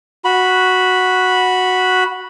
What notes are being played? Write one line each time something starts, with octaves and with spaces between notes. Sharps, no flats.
F#4 B5